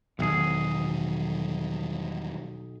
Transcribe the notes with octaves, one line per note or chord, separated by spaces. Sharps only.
E1 B1 D#3 F#3 G#4